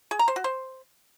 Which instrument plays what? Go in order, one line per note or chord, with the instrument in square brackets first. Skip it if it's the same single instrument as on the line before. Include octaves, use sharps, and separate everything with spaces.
[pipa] G#4
A#5
C5
F#4
C5